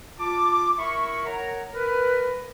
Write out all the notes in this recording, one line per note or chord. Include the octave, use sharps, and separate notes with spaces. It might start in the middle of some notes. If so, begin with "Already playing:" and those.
F4 A5 D6
E4 A#4 E5 B5 C#6
A#4 C#5 F#5 A#5
A#4 B4